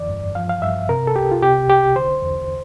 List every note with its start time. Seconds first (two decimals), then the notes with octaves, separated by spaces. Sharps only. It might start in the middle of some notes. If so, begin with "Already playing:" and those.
Already playing: F2 D3 E3 D5
0.09 G2
0.35 F3 F5
0.49 F5
0.62 G2 E5
0.89 C3 A#4
1.07 A4
1.16 C2 G4
1.32 F4
1.42 C3 G4
1.68 C2 G4
1.96 D3 C5
2.22 E2